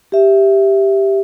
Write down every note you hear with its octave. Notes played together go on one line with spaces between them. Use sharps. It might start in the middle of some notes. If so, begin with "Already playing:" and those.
G4 E5